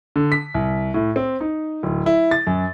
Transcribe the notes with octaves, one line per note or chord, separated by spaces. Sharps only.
D3
B6
C2
A2
C4
D#4
D1
E4
A6
F#2